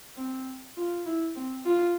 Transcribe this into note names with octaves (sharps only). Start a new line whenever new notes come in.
C4
F4
E4
C4
F4